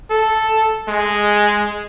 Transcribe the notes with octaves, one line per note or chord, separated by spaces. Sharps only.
A4
G#3